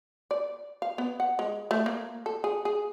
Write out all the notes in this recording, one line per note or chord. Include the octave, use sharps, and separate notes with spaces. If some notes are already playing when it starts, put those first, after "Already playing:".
D5
F5
B3
F#5
G#3
A3
A#3
A4
G#4
G#4